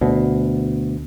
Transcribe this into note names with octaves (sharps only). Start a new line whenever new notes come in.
D2 B2